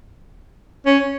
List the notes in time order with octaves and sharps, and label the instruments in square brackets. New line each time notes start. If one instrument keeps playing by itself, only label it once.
[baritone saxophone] C#4